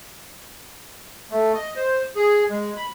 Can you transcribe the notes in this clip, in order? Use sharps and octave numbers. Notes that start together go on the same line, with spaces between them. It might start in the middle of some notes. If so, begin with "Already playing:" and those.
A3
D#5
C5
G#4
G#3
B5